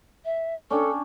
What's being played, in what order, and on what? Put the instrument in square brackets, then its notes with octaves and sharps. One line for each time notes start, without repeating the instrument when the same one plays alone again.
[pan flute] E5
[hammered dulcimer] C#4 D4 G5 [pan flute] A4